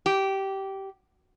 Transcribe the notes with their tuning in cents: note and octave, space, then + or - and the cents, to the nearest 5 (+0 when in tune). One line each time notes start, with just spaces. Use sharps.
G4 -15